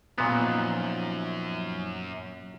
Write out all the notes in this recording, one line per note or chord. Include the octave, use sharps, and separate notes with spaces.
F#2 A#2 B3
F3 D#4 F4